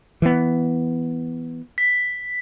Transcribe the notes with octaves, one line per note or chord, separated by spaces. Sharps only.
E3 B3
B6